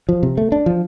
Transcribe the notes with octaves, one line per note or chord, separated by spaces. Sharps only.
F3
C3
A3
D4
F3